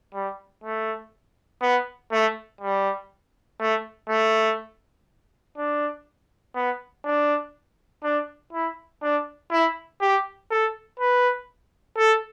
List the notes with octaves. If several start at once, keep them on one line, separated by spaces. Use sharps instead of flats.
G3
A3
B3
A3
G3
A3
A3
D4
B3
D4
D4
E4
D4
E4
G4
A4
B4
A4